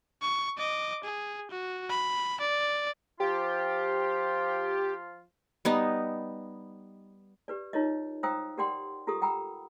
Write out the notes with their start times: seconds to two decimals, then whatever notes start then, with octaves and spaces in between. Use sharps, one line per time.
0.22 C#6
0.58 D#5 D6
1.04 G#4
1.51 F#4
1.90 B5
2.41 D5
3.20 F3 F4 G4
5.65 G3 B3 D#4
7.48 G4 B4 D5
7.73 D#4 F4 A#4 C#5 D#5
8.23 C5 F5 G5 A#5 D#6 E6
8.58 G4 A#4 D5 F#5 G5 C6
9.07 F4 G4 A4 A#4 D#6
9.22 F#5 G5 A#5 B5 E6